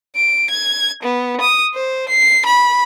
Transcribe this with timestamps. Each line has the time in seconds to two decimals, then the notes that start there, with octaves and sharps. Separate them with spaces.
0.15 D7
0.50 G#6
1.03 B3
1.41 D#6
1.74 C5
2.09 C7
2.46 B5